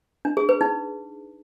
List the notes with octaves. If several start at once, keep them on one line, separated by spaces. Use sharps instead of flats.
D4
G#4
B4
D#4